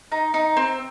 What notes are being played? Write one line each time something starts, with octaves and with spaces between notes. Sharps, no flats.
D#4
D#4
C4